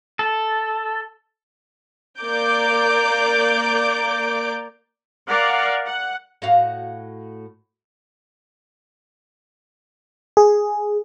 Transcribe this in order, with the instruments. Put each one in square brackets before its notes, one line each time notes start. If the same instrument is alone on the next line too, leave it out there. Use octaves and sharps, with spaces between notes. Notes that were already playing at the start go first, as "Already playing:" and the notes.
[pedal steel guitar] A4
[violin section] A#3 D5 A#5 D6 G6 D7
[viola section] A#4 D5 F5 F#5
F#5
[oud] A2 F#4 F5
[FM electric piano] G#4